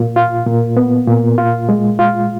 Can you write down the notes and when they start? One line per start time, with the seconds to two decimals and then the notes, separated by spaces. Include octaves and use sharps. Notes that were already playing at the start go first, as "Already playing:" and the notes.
Already playing: A#2 F4
0.16 F4
0.46 A#2
0.77 B3
1.07 A#2
1.38 F4
1.69 G#3
1.99 F4